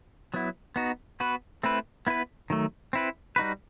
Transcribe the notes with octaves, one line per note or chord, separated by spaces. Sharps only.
F#3 B3 E4
B3 D#4 F#4
B3 F#4 B4
A3 C4 E4 B4
B3 E4 B4
D#3 F#3 A3
C4 E4 B4
G3 D#4 F#4 B4